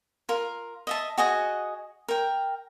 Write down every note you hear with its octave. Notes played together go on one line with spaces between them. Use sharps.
F4 A#4
D#5 E5 A5
F#4 G#4 D#5 F#5
A#4 G5